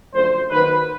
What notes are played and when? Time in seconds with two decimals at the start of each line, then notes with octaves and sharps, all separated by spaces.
0.14 F#2 D3 F3 A3 C5
0.51 D#3 F#3 A#3 D#4 B4